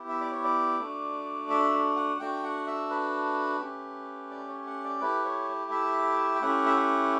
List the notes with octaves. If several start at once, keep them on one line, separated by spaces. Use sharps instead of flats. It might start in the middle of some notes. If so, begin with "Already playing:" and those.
Already playing: B3 E4 G4
E5
D5
C#5
D5
A3 D4 F#4
E5
F#5
A3 D4 F#4 G5
F#5
E5
B4
A3 C#4 G4
D5
C#5
F#5
D5
A3 E4 G4 B4
C#5
E5
G5
A3 C#4 E4 G4 F#5
E5
F#5